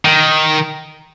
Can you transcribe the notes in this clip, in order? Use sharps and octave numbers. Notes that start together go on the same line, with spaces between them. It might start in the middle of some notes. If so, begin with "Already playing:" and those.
D#3